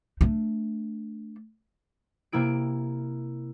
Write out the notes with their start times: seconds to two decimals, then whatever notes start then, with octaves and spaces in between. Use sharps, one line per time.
0.21 A3 D4
2.32 C3 A#3 E4 D7